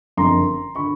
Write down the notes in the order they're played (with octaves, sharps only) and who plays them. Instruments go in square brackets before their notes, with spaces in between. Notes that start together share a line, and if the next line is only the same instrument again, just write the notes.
[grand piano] F#1 F2 D3 A#5 C6
D3 B5 C#6